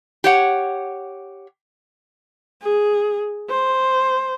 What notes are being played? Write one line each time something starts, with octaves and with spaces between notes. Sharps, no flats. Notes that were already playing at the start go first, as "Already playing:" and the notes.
G4 C#5 F#5
G#4
C5